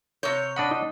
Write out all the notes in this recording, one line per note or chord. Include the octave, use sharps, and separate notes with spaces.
C3 C#5 G6
D4 D#5 F#5 B5
D#4